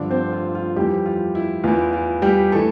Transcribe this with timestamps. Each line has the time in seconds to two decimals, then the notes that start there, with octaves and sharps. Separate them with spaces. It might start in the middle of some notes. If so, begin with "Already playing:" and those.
Already playing: G2 D3 F3 D4 D5
0.11 C4 C5
0.33 F4
0.55 F4
0.76 F2 E3 G3 G4
1.06 F4
1.35 E4
1.64 E2 E3 F4
1.93 F4
2.22 G3 G4
2.52 E3 A3 A4